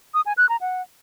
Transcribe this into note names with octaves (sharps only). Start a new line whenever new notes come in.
D#6
G#5
F#6
A#5
F#5